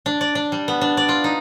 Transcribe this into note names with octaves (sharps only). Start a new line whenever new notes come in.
D4
D5
D4
G3
B3
D4
D5
F4
D#4